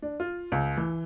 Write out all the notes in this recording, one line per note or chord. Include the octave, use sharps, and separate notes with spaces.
D4
F4
C#2
E3